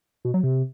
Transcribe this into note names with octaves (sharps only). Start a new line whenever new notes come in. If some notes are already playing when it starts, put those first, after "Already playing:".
B2
F#3
C3